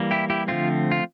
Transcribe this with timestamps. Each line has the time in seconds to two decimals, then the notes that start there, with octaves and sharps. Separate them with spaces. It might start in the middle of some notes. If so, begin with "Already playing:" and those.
Already playing: E3 G3 A#3
0.11 E4 G4
0.30 E4 G4
0.48 D3 F3 A3 C4 F4
0.92 F4